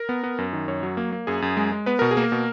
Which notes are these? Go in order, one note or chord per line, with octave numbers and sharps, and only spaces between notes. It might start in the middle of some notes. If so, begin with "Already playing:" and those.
Already playing: A#4
B3
B3
F#2
D#3
F#2 C#5
F#3
A#3
A#3
F#2 G#4
F#2
G#3
G#3
B3 B4
B2 A#4
G#4
A#3
A#4
B2